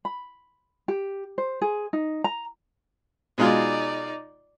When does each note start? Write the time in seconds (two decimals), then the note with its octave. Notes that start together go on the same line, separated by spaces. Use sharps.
0.05 B5
0.88 G4
1.38 C5
1.62 G#4
1.93 D#4
2.24 A#5
3.38 B2 G#3 D#4 F4 D5